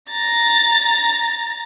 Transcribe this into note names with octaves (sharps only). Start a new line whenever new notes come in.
A#5 A6